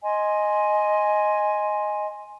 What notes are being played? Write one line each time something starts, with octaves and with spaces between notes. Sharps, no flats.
D#5 G#5 C6